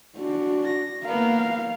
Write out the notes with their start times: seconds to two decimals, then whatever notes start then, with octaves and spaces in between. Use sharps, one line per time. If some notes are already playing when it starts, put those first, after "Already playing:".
0.18 D4 F#4
0.64 A#6
1.05 A#3 B3 A#4 F5